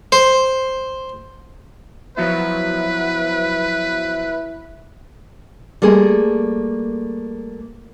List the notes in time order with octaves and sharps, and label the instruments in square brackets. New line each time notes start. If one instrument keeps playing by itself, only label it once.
[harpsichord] C5
[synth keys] F3 F#3 B3 [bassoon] E4 [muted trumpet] B4
[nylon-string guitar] G3 A3 A#3 G#4